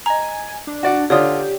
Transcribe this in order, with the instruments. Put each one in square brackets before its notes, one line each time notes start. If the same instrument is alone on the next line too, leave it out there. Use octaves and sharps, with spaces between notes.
[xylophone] D#5 A#5 [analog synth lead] G#5
[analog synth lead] D4
[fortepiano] F#4 D5 F#5
[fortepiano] D3 F4 [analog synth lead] G4 [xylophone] C#5 D5 D#6